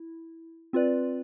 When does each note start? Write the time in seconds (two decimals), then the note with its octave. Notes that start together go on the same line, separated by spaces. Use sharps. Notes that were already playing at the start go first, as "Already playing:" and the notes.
Already playing: E4
0.73 C4 F4 B4 D5